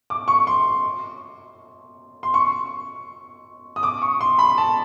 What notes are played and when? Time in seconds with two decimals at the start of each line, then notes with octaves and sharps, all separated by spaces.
0.10 D6
0.28 C#6
0.47 C6
2.23 C6
2.34 C#6
3.76 D#6
3.83 D6
4.02 C#6
4.21 C6
4.38 B5
4.58 A5